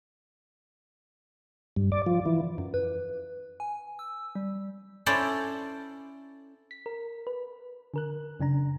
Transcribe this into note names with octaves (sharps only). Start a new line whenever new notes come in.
G2
D5
F3
E3
F#2
B4
G#5
E6
G3
C#4 E4 A4 C5 D5
B6
A#4
B4
D3 A#4 F#6
F#2 C#3 D4 A#5